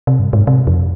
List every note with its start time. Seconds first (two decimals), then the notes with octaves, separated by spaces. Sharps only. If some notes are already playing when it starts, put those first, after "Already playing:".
0.07 C3
0.19 G2
0.33 G#2
0.47 C3
0.67 F2